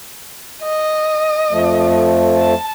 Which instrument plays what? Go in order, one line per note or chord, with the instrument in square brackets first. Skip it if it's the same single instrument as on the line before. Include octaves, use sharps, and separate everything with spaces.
[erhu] D#5
[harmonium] F2 F3 A3
[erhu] A5